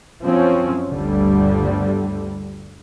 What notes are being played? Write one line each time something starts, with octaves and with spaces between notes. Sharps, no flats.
F#2 F3 C4 C#4
G1 D2 D3 G3